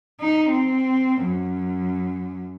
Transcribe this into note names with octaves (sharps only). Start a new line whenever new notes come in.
D#4
C4
F#2